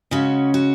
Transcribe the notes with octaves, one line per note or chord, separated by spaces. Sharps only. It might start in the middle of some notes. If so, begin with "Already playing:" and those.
C#3 G#3 C#4 F#4
F#4